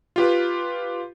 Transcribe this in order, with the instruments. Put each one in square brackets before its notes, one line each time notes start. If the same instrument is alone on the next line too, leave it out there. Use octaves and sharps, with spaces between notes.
[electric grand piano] F4 G4 B4